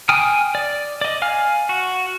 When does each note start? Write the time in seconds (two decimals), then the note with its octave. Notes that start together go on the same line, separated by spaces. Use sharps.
0.09 G5 G#5 D#6 F6
0.55 D5
1.01 D5 D#5
1.22 F5 G#5 F6
1.69 F#4